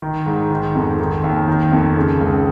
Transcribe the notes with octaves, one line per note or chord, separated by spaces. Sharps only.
D#3
G#2
D#3
F2
D#3
D#2
D#3
F2
C#3
C#2